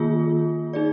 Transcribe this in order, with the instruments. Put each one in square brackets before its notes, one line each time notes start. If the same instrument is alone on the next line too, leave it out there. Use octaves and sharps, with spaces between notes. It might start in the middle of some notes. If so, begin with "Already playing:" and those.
Already playing: [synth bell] D#3 A#3 F4 G#4
D#4 G#4 D5